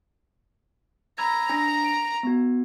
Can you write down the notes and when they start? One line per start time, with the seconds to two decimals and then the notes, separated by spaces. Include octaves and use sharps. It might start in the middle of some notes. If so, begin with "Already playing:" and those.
1.18 A#5 B5 E6 G#6
1.49 D4 G#5 A#6
1.85 D7
2.23 B3 F#4